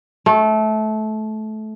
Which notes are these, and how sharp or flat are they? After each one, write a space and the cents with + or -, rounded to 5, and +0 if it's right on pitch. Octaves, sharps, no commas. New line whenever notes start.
A3 -20